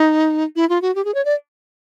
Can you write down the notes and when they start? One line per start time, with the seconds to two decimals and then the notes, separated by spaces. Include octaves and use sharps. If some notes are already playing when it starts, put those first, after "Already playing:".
Already playing: D#4
0.56 E4
0.69 F4
0.82 F#4
0.95 G4
1.05 G#4
1.15 C#5
1.25 D5